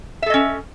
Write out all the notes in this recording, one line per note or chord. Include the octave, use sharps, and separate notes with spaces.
C#4 A4 D#5 E5